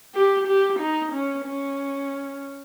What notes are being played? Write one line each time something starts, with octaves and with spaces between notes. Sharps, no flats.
G4
G4
D#4
C#4
C#4